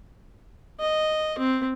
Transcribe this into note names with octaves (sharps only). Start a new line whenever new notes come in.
D#5
C4